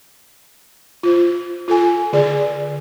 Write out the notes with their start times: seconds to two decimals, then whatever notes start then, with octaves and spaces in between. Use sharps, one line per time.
1.03 F4 C5
1.68 F4 A4 G#5
2.13 D3 G#4 D5